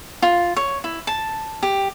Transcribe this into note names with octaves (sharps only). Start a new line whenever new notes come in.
F4
C#5
E4
A5
G4